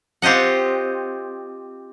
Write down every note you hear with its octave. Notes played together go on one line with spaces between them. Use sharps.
C4 F4 G4 D#5 F#5